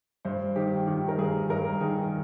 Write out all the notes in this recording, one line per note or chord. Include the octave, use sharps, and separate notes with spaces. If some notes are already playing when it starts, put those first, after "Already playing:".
G2 C5
D#3 G4
D#3 G4
A#4
G2 G#4
G2 A#4
D#3 G#4